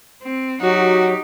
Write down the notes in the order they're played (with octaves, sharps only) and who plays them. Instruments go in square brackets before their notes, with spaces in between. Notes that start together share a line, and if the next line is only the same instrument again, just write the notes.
[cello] C4
[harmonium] F#3 [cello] D#4 G4 [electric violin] F#4